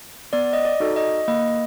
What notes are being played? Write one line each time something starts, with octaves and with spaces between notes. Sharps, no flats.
B3 D5
D#5
D5
D#4 F#4 A4
D#5
A#3 D#5